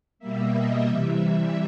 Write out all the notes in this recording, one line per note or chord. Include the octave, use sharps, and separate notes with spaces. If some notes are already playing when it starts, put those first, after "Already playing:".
B2 G3 A#3 E5
D#5
C3 E3 G3 E5